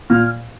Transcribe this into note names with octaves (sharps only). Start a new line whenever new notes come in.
A#2 F6